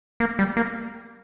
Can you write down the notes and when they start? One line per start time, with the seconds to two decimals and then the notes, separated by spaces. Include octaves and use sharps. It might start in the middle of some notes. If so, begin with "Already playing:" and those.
0.20 A#3
0.39 G3
0.57 A#3